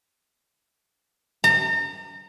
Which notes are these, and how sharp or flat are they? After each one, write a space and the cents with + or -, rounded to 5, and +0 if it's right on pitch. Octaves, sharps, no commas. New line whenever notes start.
A#5 -40